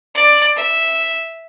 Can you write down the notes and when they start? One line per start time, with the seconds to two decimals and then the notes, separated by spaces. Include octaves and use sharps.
0.15 D5
0.56 E5